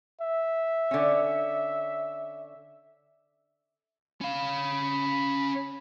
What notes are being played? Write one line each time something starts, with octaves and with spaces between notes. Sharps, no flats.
E5
D3 C#4
C#4 F5 B5